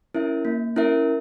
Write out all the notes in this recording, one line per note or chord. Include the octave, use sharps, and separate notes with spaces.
C#4 E4 A#4 E5
A#3
C#4 E4 A#4 E5